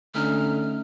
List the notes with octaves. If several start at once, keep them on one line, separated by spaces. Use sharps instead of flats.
D3 A3 C#4 D#4 F6